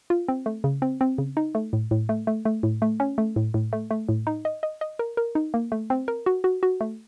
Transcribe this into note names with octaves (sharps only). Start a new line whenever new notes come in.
F4
C4
A3
C#3
C4
C4
C#3
D#4
A3
A2
A2
A3
A3
A3
A2
A3
C#4
A3
A2
A2
A3
A3
A2
D#4
D#5
D#5
D#5
A#4
A#4
D#4
A#3
A3
C4
A#4
F#4
F#4
F#4
A3